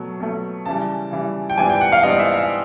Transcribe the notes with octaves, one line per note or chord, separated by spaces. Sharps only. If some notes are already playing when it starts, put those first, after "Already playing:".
Already playing: B2 F#3 A3
B2 F#3 A3
C#3 E3 G3 A5
C#3 E3 G3
G5
G#2 E3 G3 B3 D4 G#5
G5
F#5
F5
G#2 E3 G3 B3 D4 D#5
E5
F5